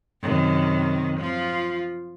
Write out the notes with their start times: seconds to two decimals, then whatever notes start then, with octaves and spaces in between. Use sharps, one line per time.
0.22 F#2 C3 D#3
1.19 F3 F4